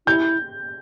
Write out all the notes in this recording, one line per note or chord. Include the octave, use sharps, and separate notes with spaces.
E4 G6